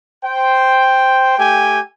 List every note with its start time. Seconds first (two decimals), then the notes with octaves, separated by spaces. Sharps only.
0.25 C5 G5
1.38 A3 G4 G5 G#5